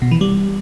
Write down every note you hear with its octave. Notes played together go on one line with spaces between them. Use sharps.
B2
E3
G3